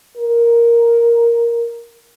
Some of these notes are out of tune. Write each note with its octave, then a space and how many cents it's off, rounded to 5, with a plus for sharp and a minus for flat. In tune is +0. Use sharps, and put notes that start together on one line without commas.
A#4 +5